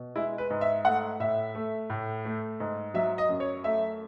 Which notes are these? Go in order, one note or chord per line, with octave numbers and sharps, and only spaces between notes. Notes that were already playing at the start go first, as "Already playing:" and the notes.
Already playing: B2
G#3 E4
B4
G#2
E5
A3 F#5
A2 E5
A3
A2
A3
G#2
F#3 E5
D#5
F#2
C#5
A3 E5